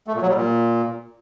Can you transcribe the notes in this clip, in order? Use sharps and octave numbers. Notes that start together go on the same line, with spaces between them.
A3
A#2
F#3
G3
A#2